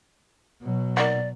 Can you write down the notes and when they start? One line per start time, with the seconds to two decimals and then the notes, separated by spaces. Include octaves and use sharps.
0.61 B2 F#3
0.97 A#3 D#4 F#4 D5